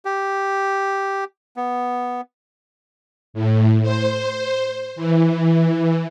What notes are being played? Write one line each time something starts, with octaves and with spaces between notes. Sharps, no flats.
G4
B3
A2
C5
E3